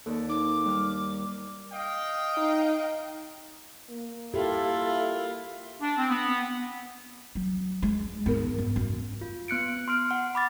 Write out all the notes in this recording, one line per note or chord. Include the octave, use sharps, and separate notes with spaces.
D#2 A4 D5
D#4 D6
G3 F6
D#5 F5 G5
D#4
A#3
E4 F4 G4 A4
D4
C4
B3
F#3
G#3
G#2 D#3 B3 A#4
F#2
F#2
F4
B3 F#6 C#7 D7
C6 F6 D7
F#5
B5 D6 A6